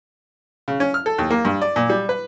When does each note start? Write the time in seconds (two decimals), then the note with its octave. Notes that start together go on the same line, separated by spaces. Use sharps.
0.68 C#3
0.80 C#4
0.94 F6
1.06 A4
1.18 D#2
1.30 A#3
1.45 G2
1.62 D5
1.76 A#2
1.89 G3
2.09 B4